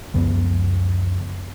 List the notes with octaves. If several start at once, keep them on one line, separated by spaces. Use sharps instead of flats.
C#2 F#2 F3 B3